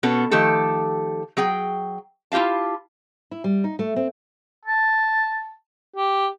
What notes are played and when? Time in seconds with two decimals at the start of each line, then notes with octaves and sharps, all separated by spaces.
0.03 B2 B3 C#4 A4
0.31 D#3 F3 A3 G4 A4
1.37 F#3 G#4 G5
2.32 E4 F4 G4 F5 A5
3.31 E4
3.44 G3
3.64 D#4
3.79 A3
3.96 C4
4.65 A5
5.96 G4